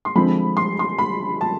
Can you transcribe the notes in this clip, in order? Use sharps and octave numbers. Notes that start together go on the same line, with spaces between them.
C6
D3 F3 G#3 C4 B5
C6
C6
B5
A5